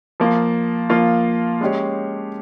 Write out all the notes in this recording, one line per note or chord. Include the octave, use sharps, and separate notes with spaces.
F3 A#3 F4
F3 A#3 F4
G#3 C#4 G4 C#5